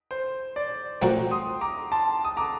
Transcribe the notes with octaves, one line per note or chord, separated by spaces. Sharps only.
C5
D5
A#2 F#3 A3 C4 F#4 G5 A#5
C6 D#6
A#5 D6
A5 C6
D#6
A#5 D6